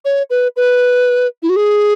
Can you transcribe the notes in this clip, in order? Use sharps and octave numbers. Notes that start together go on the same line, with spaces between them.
C#5
B4
B4
E4
F#4
G#4